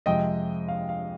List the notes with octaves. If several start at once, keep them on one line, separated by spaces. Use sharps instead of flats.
F2 C3 F3 G#3 D#5 G5
F5
F5